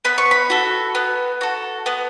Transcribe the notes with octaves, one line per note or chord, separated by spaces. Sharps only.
B3 B5
C#6
B5
F#4 A4
B3
F#4 A4
B3